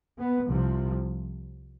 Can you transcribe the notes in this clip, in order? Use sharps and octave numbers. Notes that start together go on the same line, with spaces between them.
B3
C2 C3 F3